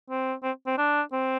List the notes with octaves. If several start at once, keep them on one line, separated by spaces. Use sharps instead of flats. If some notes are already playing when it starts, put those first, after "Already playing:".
C4
C4
C4
D4
C4